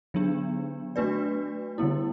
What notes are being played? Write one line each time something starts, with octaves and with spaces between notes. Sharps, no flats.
D3 F#3 B3 D4
A3 D4 F#4 B4 D5
D3 G3 B3 E4